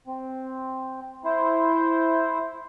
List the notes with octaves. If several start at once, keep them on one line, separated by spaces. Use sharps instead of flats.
C4
E4 C5